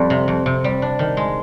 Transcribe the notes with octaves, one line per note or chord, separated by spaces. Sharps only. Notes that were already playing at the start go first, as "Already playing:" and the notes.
Already playing: F2 G3
C3
F2
C3
G3
D4
D#3
G#3